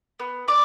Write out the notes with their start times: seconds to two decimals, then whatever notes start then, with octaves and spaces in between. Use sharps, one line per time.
0.19 B3
0.48 B3 D5 D6